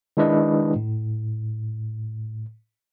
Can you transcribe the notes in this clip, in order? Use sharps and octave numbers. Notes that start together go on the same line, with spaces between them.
D#3 G#3 D4 E4 B4 D#5
A2